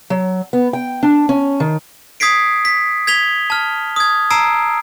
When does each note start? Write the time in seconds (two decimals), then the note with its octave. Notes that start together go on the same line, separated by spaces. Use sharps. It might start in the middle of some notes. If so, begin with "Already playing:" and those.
0.10 F#3
0.53 B3
0.73 G5
1.03 D4
1.29 C#4
1.60 D#3
2.20 D#6 G#6 B6 C7 D7
2.65 B6
3.07 G#6 B6 F7 G7
3.50 A5 F6
3.96 D#6 G#6
4.30 A5 A#5 E6 C7 D7